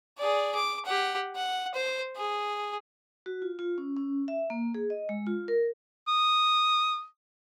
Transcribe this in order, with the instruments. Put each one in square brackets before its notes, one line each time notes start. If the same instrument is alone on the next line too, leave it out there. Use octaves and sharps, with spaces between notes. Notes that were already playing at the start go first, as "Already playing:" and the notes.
[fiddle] G#4 D5
D6
G4 F#5
F#5
C5
G#4
[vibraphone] F#4
F4
F4
C#4
C#4
E5
A#3
G#4
D#5
G#3
F4
A#4
[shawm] D#6